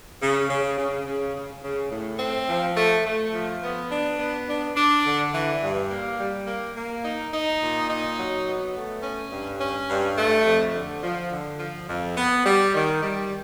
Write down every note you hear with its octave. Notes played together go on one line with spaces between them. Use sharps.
C#3
C#3
C#3
C#3
C#3
C#3
A2
C4
F3
A3
A3
F3
B3
D4
B3
D4
D4
D3
E3
G2
A#3
G3
A#3
A#3
D#4
D#4
A#2
D#4
F#3
B3
A3
C#4
G2
C#4
G2
A3
F2
D3
F3
D3
F3
F2
B3
G3
D#3
G3